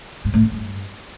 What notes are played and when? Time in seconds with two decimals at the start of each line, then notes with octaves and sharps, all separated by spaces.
0.25 G#2
0.34 A2
0.43 E3
0.51 G2